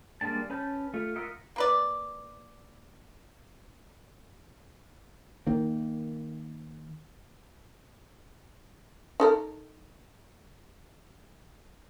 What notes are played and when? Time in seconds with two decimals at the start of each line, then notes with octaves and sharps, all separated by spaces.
0.21 G3 G#3 A#3 D4 A5
0.50 C#4 B4 A5 G6
0.94 A3 F4
1.16 F4 A#4 D#5 E5 F#5
1.56 A#3 B4 D5
5.47 D#3 A#3
9.20 D#4 A4 A#4